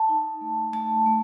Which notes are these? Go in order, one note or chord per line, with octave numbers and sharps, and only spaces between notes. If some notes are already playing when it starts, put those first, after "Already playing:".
Already playing: A5
D#4
A3
A3 A5
A3